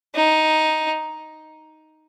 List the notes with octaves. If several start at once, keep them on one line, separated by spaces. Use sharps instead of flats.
D#4